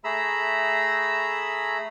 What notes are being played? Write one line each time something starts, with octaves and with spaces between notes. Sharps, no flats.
A3 G#4 A#5 B5 E6